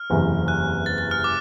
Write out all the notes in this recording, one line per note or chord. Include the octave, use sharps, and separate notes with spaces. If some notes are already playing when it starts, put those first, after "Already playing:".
Already playing: F6
F#1 E2 C3 E3
F#6
A6
A6
F6
D6